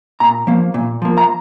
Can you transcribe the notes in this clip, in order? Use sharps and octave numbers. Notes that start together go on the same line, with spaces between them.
A#2 A#5
F3 A#3
A#2
F3 A#3
A#5